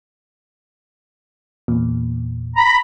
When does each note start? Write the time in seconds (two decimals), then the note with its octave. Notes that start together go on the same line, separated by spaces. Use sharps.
1.68 E2 A#2
2.57 A#5 B5